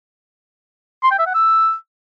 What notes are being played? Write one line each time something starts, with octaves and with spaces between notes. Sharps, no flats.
C6
G5
E5
F#5
E6